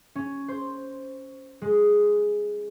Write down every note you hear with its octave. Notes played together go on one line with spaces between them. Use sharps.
C#4
C5
G#3